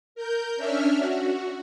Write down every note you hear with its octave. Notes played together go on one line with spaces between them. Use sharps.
A#4 G6
C#4 D4 E5 F6
F#4